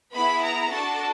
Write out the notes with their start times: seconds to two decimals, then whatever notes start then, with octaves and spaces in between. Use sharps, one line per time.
0.14 B3 E4 G#4 B5
0.43 A#5
0.71 D4 F#4 A4 A5